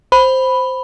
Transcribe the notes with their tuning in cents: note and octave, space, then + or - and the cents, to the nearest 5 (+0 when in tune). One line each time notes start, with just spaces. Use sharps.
C5 +0 B5 +5